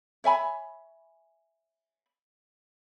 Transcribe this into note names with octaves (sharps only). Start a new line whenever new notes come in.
C#5 E5 G#5 B5